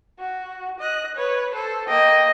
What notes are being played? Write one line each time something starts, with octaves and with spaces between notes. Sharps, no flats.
F#4
D#5 F#6
B4 C#5
A4 C5
A#3 D#5 G5